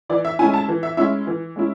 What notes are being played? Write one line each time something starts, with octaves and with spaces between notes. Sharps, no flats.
E3 D5
E5
G#3 C#4 E4 G#5
A5
E3
E5
G#3 C#4 E4 E5
E3
G#3 C#4 E4